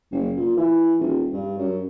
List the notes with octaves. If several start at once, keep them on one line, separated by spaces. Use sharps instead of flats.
F#1
A#2
E3
D#1
G2
F#2